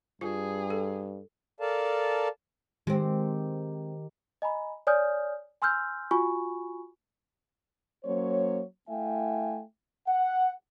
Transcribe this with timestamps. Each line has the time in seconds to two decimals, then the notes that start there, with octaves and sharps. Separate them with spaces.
0.21 G2 F4 G#4
0.70 A4
1.60 A4 A#4 D5 F5 A5
2.87 D#3 G#3 C4 G4
4.42 D#5 G#5 A#5 B5
4.87 C#5 D5 G#5 D#6 F6 G6
5.62 G#5 C6 E6 F6 G6
6.11 F4 F#4 G#5 B5 C#6
8.04 F#3 A#3 C#4 C5 C#5
8.89 A3 E4 E5 F5 G5 G#5
10.07 F#5